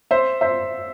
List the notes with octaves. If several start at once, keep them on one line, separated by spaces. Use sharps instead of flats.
C5 E5
C5 E5